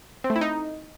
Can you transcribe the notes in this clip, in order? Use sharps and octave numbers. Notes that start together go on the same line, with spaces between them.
C4
A3
E4
D#4